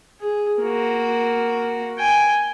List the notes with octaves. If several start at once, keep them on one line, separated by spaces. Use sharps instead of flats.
G#4
A#3 F#4
G5 G#5